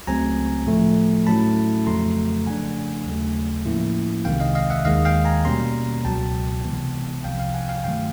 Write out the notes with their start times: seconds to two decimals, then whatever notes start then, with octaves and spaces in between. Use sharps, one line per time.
0.07 C#2 C#3 F#3 A3 C4 G#5 A#5
0.67 A2 F3 A3
1.27 A2 F#3 A3 C#4 E4 A5 B5
1.86 F2 C#3 F#3 A3 A#5 C6
2.46 C#3 F3 A3 D4 F#5 G#5
3.06 D#2 C#3 F#3 A3
3.65 A2 F3 A#3 C#4 E4
4.25 C2 C3 D#3 G#3 F5 G5
4.40 D#5 F5
4.55 D#5 F5
4.70 E5 F#5
4.85 D#2 D#3 G#3 D#5 F5
5.05 F5 G5
5.25 G#5 A#5
5.45 B2 G3 A#3 C#4 A#5 C6
6.05 C#2 B2 F#3 G5 A5
6.65 C3 E3 G#3 B3
7.24 C2 C3 F3 F5 G5
7.40 F5 G5
7.54 F#5 G#5
7.69 F5 G5
7.84 G2 D#3 F#3 A3 F5 G5